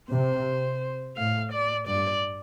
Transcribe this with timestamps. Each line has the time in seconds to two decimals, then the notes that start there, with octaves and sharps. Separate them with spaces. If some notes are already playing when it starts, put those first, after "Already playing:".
0.11 C3 C5
1.17 A2 F5
1.52 D5
1.87 G2 D5